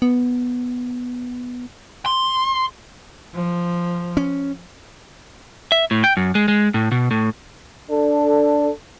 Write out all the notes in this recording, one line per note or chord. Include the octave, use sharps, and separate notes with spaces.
B3
C6
F3
C#4
E5
A2
G5
F#2
G#3
G#3
A2
B2
A2
D4 A4